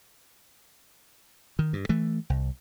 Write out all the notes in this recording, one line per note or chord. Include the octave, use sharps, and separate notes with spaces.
D#3
G2
E3 A3
C2